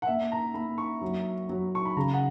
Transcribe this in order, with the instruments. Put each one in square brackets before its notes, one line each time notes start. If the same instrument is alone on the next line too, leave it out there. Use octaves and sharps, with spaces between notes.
[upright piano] F#5
[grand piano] A#3 [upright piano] E5
[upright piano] A#5
[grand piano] A#3 [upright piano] B5
[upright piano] C#6
[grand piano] F#3
F#3
[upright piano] C#6
B5
[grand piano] C#3 [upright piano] A#5
[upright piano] F#5